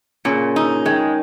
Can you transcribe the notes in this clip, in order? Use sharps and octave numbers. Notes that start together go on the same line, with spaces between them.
A#2 C#3
D#4
D#3 G#3